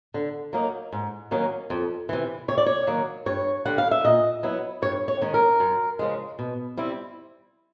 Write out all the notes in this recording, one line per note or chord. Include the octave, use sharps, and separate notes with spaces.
D3
F#3 A#3 D#4
G#2
D#3 F#3 A#3 C#4
F2
C3 E3
C3 C#5
D5
C#5
D#3 F#3 A#3
G2 C#5
D3 G3 F#5
F5
E5
A#2 D#5
F#3 B3 E4
G2 C#5
C#5
D#3 G#3 C#4
A#4
F#2
C#3 F3 G#3
B2
G3 C4 E4